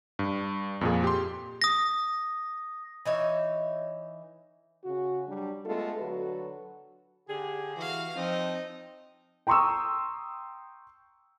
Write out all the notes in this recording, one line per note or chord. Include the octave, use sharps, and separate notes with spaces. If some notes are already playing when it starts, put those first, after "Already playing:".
G2
F2 A#2 G#4
G4 C6
D#6 A#6
E3 D#4 C#5 E5
C#3 F#4
F#3 G3 D4
G#3 A3 B3 F4 A4
D3 F#3 F#4 A4 B4
D3 G4 G#4
E3 F#4 F5
F3 C4 D#4
G5 A#5 C6 C#6 D#6 E6